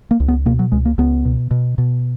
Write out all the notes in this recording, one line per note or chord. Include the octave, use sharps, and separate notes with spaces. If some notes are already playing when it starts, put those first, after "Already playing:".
A#3
C#2
B3
B2 A#3
F#3
C#2 G#3
A#3
C#2 B3
B2
B2
B2